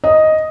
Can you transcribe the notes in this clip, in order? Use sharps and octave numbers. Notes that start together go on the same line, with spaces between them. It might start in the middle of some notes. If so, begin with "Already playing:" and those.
D#5